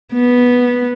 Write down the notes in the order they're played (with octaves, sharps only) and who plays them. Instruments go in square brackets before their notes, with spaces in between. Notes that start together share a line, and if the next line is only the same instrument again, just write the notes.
[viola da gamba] B3